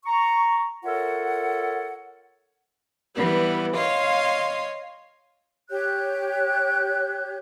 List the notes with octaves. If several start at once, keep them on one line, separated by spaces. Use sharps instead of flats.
A#5 C#6
F4 A4 A#4 C#5 E5 F#5
E3 G3 B3
C#5 D#5 F5 C6
G4 C#5 F#6 G6